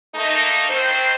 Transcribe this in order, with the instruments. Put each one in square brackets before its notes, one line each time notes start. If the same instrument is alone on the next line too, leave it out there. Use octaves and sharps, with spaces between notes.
[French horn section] A3 A#3 D#4
D#3 C4 C5